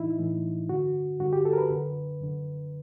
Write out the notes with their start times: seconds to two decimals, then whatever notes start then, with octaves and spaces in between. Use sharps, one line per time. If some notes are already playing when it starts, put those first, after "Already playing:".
Already playing: A2 E3 D#4 E4
0.19 A2 E3
0.69 G2 D3 F#4
1.20 G2 D3 F#4
1.33 G4
1.45 A4
1.53 A#4
1.58 B4
1.70 F#2 D3
2.21 F#2 D3